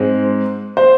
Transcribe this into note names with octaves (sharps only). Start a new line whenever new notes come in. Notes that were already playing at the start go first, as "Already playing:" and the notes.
Already playing: G#2 G#3 C4
C5